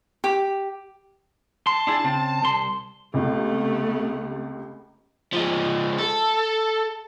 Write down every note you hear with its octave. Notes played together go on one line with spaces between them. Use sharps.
G4
A5 C6
D4 E4 G#4
C#3 C4
C2 C6
C#2 C3 A3 B3
F3 G#3
A4